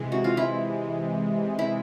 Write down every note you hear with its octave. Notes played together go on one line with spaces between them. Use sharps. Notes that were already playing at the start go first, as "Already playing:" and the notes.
Already playing: C3 E3 G#3
F#4
F4
E4
E4